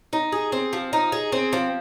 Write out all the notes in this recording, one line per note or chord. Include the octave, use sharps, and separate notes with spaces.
D#4
G#4
C4
F3
D#4
G#4
C4
F3